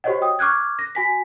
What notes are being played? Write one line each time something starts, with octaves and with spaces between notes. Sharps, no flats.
F#4 G4 C5 C#5 D#5 F#5
G5 D#6
C#6 D6 F6 F#6 G#6
A#6
F#4 G#5 B6